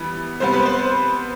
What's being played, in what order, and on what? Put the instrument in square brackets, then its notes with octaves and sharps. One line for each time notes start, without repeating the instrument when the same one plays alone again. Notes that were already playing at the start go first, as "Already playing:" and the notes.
Already playing: [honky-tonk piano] E3 G3 B3
C3 G3 B3 C5
B4
C5